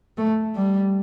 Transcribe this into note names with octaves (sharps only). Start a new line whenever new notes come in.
A3
G3